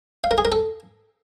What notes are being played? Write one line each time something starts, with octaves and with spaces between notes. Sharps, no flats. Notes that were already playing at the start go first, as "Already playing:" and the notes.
F5
A#4
G#4
A#4
A4